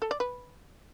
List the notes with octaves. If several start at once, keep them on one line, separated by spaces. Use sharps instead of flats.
A4
D5
B4